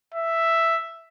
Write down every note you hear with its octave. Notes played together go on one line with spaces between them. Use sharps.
E5